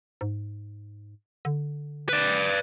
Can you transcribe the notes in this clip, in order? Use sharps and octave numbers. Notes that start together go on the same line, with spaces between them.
G#2
D3
B4 D5